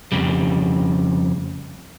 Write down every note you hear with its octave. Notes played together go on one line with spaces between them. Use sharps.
F2 C#3 G3